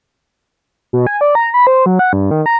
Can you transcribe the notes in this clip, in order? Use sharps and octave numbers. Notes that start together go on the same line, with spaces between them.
B2
G#5
D5
A#5
B5
C5
F#3
F#5
G2
D#3
A#5